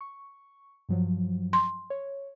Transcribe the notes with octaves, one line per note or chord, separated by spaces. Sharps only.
C#6
G2 F3 F#3
C6
C#5